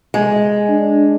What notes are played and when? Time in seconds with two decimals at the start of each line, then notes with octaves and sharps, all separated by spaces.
0.14 G#3
0.69 D4